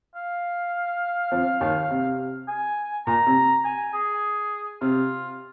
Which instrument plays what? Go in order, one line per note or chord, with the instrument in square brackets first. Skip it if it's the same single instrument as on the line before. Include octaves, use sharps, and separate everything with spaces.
[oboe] F5
[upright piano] F2 F3
D#2 D#3
C3
[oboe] G#5
[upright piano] A#2 [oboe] A#5
[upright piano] C3
[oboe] G#5
G#4
[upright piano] C3 [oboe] F4